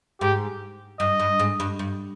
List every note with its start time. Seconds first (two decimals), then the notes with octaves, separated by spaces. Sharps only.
0.21 G#2 G4
1.00 G2 D#5
1.20 G2
1.39 G#2
1.60 G2
1.79 G2